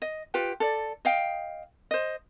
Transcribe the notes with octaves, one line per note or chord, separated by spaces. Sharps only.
D#5
F4 G4 B4 G5
A4 D5
D#5 F5 G5
C5 D#5